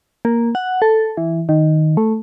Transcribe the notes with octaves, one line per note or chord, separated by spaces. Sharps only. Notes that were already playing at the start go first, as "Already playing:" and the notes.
A#3
F#5
A4
E3
D#3
A3